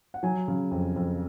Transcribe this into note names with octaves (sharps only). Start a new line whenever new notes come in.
F#5
F#3 G#5
C#3
F2
F2